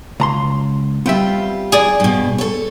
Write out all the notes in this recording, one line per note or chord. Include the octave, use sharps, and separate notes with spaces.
C#2 A#5 C6
G3 B3 C4 F4 E5
G#4 D5
G2 B2
A4 C#5